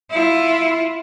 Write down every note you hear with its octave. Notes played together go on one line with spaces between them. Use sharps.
E4 F4